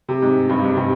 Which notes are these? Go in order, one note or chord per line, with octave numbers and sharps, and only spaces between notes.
C3
G#2
G2
G#2
C3